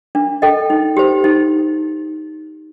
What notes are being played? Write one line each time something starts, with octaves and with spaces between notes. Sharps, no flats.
D4
A4 D#5 G5
D#4
G4 C5
D#4